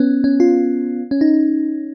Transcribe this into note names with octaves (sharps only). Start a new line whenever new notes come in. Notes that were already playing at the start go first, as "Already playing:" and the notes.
Already playing: B3 C#4
C#4
F4
C#4
D#4